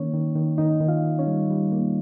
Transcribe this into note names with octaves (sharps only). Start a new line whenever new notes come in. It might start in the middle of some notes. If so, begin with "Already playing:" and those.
Already playing: D#3 A#3 C#4 C#5
D#3
D#3
D#3 D#4 D#5
D#3
F4 F5
D#3
C#4 C#5
G3
G3
A#3